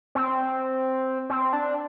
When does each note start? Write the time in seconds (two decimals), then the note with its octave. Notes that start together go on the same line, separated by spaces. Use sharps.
0.15 C4
1.30 C4
1.53 D4